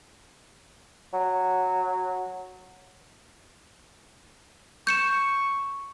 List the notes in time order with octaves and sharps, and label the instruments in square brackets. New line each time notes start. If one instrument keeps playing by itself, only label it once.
[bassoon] F#3
[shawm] C#6 [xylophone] G6 C#7 E7